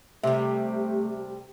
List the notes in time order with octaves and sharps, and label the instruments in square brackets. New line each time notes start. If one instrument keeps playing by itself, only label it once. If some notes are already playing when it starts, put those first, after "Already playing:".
[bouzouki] C3 G3 [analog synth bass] A3 [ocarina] G4 [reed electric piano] E5